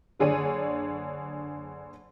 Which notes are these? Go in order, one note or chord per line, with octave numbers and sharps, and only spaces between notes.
F#1 D3 G#4 C#5 D5 D#7